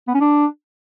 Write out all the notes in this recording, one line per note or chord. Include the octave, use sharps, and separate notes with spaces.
B3
C#4
D4